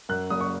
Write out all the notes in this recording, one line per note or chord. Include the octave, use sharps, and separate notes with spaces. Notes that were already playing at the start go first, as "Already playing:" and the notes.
F#2 F#6
F#1 D#6
C#6